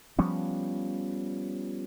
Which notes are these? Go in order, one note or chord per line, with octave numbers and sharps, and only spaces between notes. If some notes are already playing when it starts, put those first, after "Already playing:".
F3 G3 B3 C#4